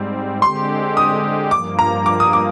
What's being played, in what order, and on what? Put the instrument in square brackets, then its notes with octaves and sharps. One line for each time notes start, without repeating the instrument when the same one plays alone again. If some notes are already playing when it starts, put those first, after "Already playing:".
Already playing: [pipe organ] G#2 G3 C4
[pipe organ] D3 G#3 C4 G4 [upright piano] C6
[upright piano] D#6
[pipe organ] G2 F3 A#3 [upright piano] D6
[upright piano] A#5
D6
D#6
D6